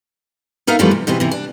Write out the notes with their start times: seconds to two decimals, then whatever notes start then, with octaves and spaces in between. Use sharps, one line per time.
0.67 B3 D#4 A#4 E5 F5
0.79 F#2 E3 F3 G3 A3 B3
0.91 C3
1.07 B2 E3 C4 G4
1.20 C3 E3
1.31 D4